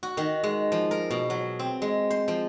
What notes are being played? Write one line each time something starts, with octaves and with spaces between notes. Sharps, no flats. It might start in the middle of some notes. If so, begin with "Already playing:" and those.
F#4
D#3
G#3
F3
A#4
B2
F#3
C4
G#3
C5
F3